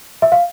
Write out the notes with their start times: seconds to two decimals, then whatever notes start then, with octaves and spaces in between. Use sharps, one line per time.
0.22 E5
0.32 F5